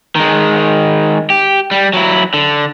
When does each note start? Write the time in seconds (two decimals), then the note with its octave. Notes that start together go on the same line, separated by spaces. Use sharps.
0.15 D#3 G#3
1.30 G4
1.71 G3
1.94 F#3 E4
2.34 D3